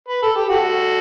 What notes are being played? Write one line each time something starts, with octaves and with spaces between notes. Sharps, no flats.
B4
A4
G4
F#4 A4